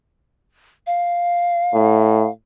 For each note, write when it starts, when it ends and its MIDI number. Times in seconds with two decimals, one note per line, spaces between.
0.87 2.30 77
1.74 2.27 45